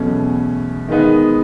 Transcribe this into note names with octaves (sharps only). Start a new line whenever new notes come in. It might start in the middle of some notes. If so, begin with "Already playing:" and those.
Already playing: E2 B2 F#3 A3 C#4
D#3 G#3 B3 D#4